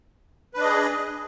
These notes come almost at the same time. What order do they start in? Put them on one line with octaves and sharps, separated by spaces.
B4 D4 D#5 G#4